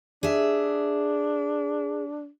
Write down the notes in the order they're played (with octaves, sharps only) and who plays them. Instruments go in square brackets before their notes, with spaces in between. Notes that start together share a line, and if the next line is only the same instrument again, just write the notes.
[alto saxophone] D4 [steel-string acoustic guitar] G#4 E5